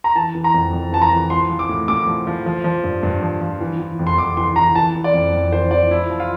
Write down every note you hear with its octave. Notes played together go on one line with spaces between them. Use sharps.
A#5
E3 A5
E3
A#5
F2
F2
E3 A5
A#5
E3
F3 C6
F3
D6
A2
A2 D6
F3
F3
F3
F3
G2
G2
F3
F3
E3
E3
F2
C6
F2 D6
E3 C6
E3 A#5
E3 A5
E3
D5
F2
F2
E3 C5
E3 D5
F3 E4
F3
F4